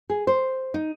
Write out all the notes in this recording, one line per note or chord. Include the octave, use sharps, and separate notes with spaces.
G#4
C5
D#4